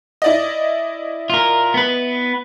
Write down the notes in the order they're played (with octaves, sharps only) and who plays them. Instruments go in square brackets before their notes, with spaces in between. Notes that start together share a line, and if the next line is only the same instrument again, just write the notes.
[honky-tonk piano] E4 D5 D#5
[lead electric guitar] F4 A#4
B3 B4